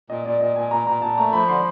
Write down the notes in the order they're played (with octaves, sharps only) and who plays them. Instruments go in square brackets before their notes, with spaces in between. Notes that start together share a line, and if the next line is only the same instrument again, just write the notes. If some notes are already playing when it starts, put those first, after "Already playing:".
[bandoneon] A#2 [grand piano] D#5
[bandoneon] A#2 [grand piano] D5
[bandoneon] A#2 [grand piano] D#5
[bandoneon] A#2 [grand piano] G#5
[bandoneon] A#2 [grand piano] A#5
[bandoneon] A#2 [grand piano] A#5
[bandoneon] A#2 [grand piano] A5
[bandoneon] A3 [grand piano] A#5
[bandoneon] F3 [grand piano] B5
[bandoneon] D3 [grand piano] C6